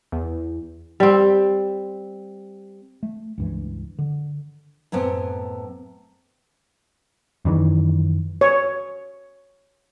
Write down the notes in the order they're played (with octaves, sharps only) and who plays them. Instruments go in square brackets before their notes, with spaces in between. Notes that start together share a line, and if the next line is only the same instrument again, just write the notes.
[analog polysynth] E2
[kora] G3 C4
[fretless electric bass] A3
C#2 G2 E3
D3
[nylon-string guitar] F#2 A2 B3 C4
[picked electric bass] F#2 D#3 E3
[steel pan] C#5